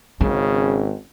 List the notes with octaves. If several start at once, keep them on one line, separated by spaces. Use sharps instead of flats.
G#1 C#3 C#4